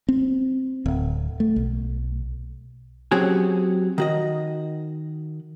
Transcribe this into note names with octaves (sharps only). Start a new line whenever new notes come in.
C4
D1
A3
B1
F#3 C4 C#4 G4 G#4
D#3 F#4 D#5